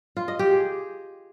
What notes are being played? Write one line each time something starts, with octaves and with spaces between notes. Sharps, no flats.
F4
D#5
G4
G#4